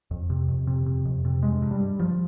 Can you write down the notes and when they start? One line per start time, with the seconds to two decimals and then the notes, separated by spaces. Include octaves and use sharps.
0.11 F2
0.30 C3
0.48 F2
0.67 C3
0.86 C3
1.05 F2
1.25 C3
1.43 G2 G#3
1.62 G2
1.71 G3
1.81 G2
1.99 G2 F3